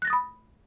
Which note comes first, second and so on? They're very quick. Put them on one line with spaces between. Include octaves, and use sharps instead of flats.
F#6 A#6 A6 D#6 B5